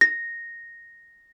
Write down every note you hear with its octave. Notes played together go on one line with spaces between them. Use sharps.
A#6